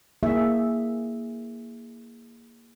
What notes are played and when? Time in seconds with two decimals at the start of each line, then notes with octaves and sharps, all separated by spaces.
0.23 A#3 E4 G#4 E5